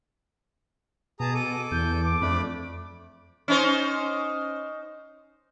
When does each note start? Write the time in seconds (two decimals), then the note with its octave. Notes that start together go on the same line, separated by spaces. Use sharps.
1.20 B2 G#4 A5 A#5 D#6
1.34 A4 D6 D#7
1.72 E2 G6
2.03 D6
2.21 F2 A3 D4 B5
3.48 C#4 D#4 C5